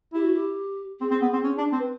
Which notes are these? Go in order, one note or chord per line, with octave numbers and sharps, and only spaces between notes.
E4 G4
F#4
G4
C4 G#4
C4
B3
C4
C#4
D4
C4
B4